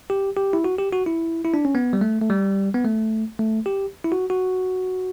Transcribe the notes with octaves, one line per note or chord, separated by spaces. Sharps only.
G4
G4
E4
F#4
G4
F#4
E4
E4
D4
C#4
B3
G3
A3
A3
G3
B3
A3
A3
G4
E4
F#4
F#4